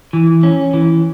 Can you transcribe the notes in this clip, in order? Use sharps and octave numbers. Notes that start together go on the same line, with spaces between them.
E3
C#4
E3